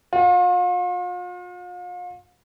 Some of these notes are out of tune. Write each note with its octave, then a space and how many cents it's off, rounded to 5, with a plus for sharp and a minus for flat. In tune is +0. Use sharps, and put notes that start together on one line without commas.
F4 +40